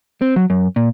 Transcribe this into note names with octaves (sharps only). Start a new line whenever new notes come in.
C4
F#3
F#2
A#2